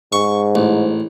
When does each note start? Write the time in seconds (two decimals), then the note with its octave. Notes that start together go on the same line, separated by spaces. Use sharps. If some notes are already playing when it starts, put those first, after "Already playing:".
0.13 G#2 C#6
0.55 A1